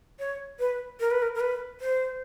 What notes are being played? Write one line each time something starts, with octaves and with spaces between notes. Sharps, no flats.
C#5
B4
A#4
B4
A#4
A#4
B4
C5